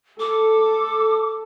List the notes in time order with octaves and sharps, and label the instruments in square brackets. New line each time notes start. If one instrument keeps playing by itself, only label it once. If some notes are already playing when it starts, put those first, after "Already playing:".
[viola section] A4 [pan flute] D6